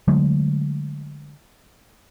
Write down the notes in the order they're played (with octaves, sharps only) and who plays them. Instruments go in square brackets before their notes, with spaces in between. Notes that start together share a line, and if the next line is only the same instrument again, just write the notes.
[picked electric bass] D3 F#3 G#3 A3